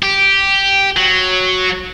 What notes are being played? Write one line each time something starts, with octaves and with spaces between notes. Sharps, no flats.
G4
F#3